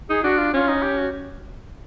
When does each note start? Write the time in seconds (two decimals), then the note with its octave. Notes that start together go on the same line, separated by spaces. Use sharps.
0.09 D#4 G#4
0.23 D4 F#4
0.38 F4
0.54 C#4 F4
0.68 D#4
0.82 G4
0.98 F#4